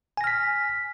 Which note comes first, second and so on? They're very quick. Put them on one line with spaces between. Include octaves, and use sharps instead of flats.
G#5 A#6 F6 B6